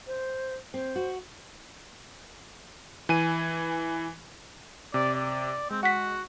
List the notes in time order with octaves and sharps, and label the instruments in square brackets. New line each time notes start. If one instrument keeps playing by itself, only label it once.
[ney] C5
[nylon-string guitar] C4 [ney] C5
[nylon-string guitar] F#4
[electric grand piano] E3 G#5 D#7
[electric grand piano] C3 [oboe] D5
[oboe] D5
[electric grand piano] G#3 [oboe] C4
[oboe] F#4 [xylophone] F#5 B6